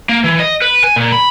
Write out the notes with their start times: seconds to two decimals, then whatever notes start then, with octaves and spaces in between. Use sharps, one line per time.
0.09 A#3
0.24 E3
0.40 D#5
0.62 B4
0.84 G#5
0.96 A#2
1.12 B5